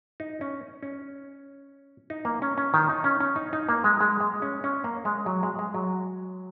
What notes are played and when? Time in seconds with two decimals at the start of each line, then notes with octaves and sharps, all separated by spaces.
0.20 D#4
0.41 C#4
0.83 C#4
2.10 D#4
2.25 A#3
2.42 C#4
2.58 C#4
2.74 D#3
2.89 D#4
3.04 C#4
3.21 C#4
3.36 D#4
3.53 D#4
3.69 A#3
3.84 G#3
4.01 G#3
4.20 G#3
4.42 C#4
4.64 C#4
4.84 A#3
5.05 G#3
5.26 F#3
5.43 G#3
5.59 G#3
5.74 F#3